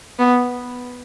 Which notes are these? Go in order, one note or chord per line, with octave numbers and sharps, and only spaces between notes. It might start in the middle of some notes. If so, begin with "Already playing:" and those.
B3